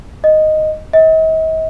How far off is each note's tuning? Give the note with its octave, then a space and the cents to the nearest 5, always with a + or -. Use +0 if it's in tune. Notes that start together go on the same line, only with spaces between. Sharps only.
D#5 +0
D#5 +45